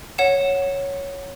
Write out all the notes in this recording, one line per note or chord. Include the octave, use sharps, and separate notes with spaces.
C#5 F#5 E7